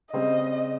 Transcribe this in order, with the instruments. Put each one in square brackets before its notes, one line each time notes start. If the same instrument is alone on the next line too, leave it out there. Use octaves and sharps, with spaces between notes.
[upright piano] C#3 G3 C4 [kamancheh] D#5